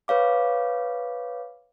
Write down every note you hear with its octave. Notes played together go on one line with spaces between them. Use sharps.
B4 C#5 F5 D6